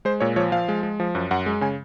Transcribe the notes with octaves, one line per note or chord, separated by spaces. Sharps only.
G#3 C5
A#2 C#5
F3 C#5
F3 F5
G#3
G#3
F3
F#2
F#2 F#5
G#3
C#3 G#5